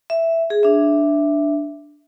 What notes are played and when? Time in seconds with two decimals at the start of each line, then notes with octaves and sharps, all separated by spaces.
0.10 E5
0.50 G#4
0.63 D4 E5